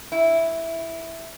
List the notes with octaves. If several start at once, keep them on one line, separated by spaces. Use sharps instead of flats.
E4